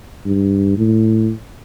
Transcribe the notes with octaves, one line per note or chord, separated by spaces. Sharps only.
G2
A2